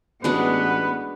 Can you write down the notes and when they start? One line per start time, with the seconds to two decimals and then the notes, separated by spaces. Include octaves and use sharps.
0.24 A1 G#3 B3 D4 F#4 B4